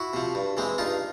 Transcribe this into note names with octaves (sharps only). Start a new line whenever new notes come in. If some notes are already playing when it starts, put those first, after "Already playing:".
Already playing: E4 F#4
C3 F3
G2
E3 G#3 C4
G2 D#4 F4